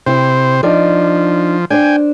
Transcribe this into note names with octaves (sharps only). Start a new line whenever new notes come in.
C3 C4 E4 C5
F3 D4 D#4 D5
D4 C5 G5 G#5